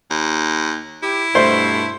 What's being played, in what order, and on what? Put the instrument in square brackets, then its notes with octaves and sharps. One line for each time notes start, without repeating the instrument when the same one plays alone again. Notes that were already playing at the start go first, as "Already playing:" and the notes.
[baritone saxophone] D#2
[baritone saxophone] E4 [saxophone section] G4
[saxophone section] G2 B2 A3 [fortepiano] C5